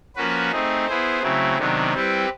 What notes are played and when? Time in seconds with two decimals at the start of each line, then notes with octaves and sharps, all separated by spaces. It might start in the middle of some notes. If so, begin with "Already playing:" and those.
0.16 F3 A#3 C#4 F#4 B4
0.52 A3 C4 D#4 G#4
0.87 B3 E4 G#4 C5
1.22 C#3 F#3 A3 C4 E4
1.58 C3 D#3 F#3 B3 D4
1.94 G3 C4 E4 G4 B4